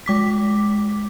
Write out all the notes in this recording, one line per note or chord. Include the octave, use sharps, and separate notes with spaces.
G#3 D6 B6